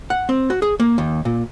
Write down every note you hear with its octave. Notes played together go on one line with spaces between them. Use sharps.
F#5
C4
F#4
G#4
A#3
D#2
A#2